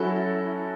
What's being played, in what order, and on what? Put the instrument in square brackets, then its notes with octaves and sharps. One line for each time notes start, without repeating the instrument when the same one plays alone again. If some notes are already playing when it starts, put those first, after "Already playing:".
Already playing: [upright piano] F#3 C#4 F#4 A4 [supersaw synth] E4